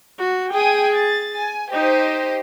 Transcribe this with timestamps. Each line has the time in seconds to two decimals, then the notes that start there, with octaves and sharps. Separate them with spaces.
0.19 F#4
0.53 G#4 G5 G#5 D#6
0.95 A6
1.39 G#5
1.72 D#4 G4 C5 D#5